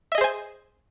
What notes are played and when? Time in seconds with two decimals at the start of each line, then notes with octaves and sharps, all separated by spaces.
0.12 E5
0.15 D#5
0.18 G#4
0.21 C5
0.24 G#5